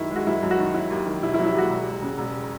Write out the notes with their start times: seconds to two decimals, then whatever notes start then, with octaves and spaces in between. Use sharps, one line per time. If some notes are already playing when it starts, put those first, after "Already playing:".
Already playing: F#2 D#3 E4
0.11 G#3
0.16 F#4
0.27 F#2 E4
0.42 F#2
0.51 F#4
0.59 D#3
0.74 F#3 E4
0.91 D#2
1.06 D#3
1.23 E1 E4
1.34 E4
1.39 F#3
1.46 E4
1.55 D#2 F#4
1.70 E1
1.86 D#2
2.02 C#3
2.18 E1